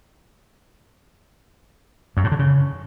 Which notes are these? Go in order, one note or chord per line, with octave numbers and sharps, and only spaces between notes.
F#2
A2
D3
C#3